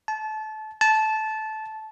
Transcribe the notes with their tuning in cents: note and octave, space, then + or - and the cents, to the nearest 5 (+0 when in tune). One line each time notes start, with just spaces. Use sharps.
A5 -25
A5 -15